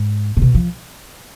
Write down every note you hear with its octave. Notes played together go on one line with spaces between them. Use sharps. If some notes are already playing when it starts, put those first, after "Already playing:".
Already playing: G#2
C3
B2
F3